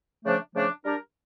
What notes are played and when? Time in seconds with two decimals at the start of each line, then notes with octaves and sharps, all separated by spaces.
0.25 C#3 F3 A3 D4
0.54 C#3 F3 A3 D4
0.83 G3 D4 G4 A#4